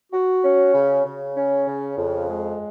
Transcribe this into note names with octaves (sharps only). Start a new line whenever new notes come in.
F#4
C#4
C#3
C#3
C#4
C#3
F2
G#3